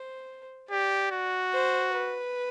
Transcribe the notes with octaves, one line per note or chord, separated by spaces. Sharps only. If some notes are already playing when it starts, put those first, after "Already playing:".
Already playing: C5
G4 D5
F#4
C5
B4